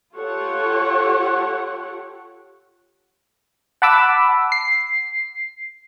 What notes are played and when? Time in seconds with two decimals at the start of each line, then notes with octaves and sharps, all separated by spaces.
0.14 F4 G4 A4 C#5 F#5
3.82 F#5 A5 B5 D6 E6
4.52 C7